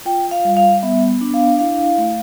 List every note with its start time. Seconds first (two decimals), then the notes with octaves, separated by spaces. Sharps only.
0.05 F4 G5
0.31 F5
0.45 G3
0.57 F5
0.83 B3 E5
1.21 D4
1.34 F5
1.59 E4 F5
1.98 A3